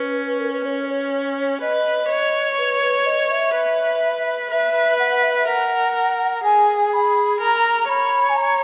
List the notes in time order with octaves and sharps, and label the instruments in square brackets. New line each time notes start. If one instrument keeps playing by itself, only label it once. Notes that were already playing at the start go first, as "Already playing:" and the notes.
Already playing: [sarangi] C#4 [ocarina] B4
[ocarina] A#4
B4
[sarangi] C#4 [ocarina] C#5
[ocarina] C#5
[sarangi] B4 [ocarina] D#5
[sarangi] C#5
[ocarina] B4
B4
D#5
E5
[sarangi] B4
[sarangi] B4 [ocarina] E5
[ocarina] F#5
F#5
E5
E5
[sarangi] A#4 [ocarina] F#5
[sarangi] G#4 [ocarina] G#5
[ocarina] B5
[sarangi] A#4 [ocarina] A#5
[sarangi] C#5 [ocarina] B5
[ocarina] G#5
A#5